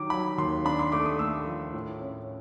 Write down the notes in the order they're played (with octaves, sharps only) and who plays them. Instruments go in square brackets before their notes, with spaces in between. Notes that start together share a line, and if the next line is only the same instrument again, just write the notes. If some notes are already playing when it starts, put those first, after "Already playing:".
Already playing: [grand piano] D#3 F#3 D6
F#3 B5
D#2 C6
D4 B5
C6
A3 D6
D#6
A3 E6
F3
A2
C#4